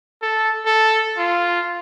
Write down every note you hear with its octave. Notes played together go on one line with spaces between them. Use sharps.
A4
A4
F4